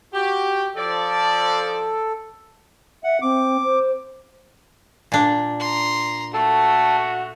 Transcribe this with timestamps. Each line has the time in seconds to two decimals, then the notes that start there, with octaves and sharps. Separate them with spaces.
0.13 F#4 G4
0.76 F3 A4 D5
3.04 E5 F#5
3.22 C4 D6
3.64 C5
5.12 A#2 D4
5.60 A#5 C6
6.34 A3 F#4 A4